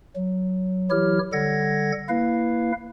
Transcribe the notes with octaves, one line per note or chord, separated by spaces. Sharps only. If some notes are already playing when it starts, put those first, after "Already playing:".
F#3
E3 F#3 E4 G4 C#5 F6
D3 G3 A4 F#5 G#6 A#6
A#3 E4 B4 F5